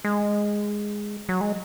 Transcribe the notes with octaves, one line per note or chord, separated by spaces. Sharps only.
G#3
F#3
G#3